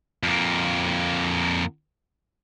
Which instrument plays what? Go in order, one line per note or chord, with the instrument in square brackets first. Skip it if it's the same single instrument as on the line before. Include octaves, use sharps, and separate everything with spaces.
[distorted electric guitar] F2 A#3